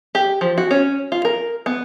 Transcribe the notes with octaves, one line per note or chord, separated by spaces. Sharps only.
G4
F3
F#4
C#4
F4
A#4
B3